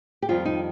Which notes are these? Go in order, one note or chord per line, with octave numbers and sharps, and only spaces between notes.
G4
F2 D#3 G3 F4
D#4